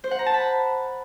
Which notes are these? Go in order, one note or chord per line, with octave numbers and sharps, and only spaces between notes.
C5
F#5
A#5
A5
B5